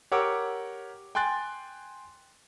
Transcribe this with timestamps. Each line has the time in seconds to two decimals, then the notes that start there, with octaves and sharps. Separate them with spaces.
0.12 G4 A#4 C#5 F#5 D6 E6
1.15 G5 G#5 C6 F#6 A6